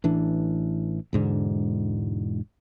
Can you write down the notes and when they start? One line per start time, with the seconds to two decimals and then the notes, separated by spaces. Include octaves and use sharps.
0.04 A1 E3 D4
1.13 E1 G#2 D3